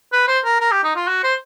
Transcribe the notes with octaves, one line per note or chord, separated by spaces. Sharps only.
B4
C5
A#4
A#4
G4
D#4
F4
F#4
C5